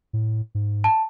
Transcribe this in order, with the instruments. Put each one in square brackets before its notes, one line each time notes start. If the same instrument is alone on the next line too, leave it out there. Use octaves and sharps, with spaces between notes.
[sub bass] A2
G#2
[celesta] A5